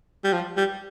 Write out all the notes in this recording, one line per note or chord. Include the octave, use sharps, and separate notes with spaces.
G3
F3
G3